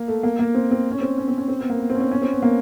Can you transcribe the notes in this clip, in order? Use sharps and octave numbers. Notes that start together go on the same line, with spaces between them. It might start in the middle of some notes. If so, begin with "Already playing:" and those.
Already playing: A#3
A3
A#3
A#3
C4
C4
C#4
C4
C#4
C4
C#4
C4
B3
A#3
B3
C4
C#4
C4
C#4
C4
B3
A#3